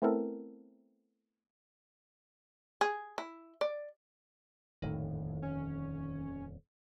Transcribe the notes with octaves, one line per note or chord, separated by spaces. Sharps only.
A3 B3 C4 E4 A4 A#4
G#4
E4
D5
D#1 F2 A2 D3 D#3
C#4